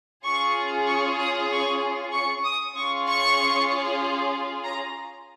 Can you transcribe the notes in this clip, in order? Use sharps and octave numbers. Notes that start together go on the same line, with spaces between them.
C#4 F4 G#4 C#6
C#6
D#6
C#6
C#6
D#6
C#4 F4 G#4 C#6
C#6
A#5